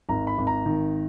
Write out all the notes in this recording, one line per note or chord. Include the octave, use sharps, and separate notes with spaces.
G#1 A#5
B5
G#1
A#5
D#3